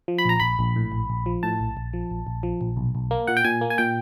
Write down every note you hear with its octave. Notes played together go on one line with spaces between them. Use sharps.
F3
B5
A#1 A#5
A#1 B5
A#1
A2
A#1
A#1
F3
A2 A5
A#1
A#1
F3
A#1
A#1
F3
A#1
B1
B1
A#3
A#2 F#5
G5
A#2 G#5
A#3
G#5
A#2 G5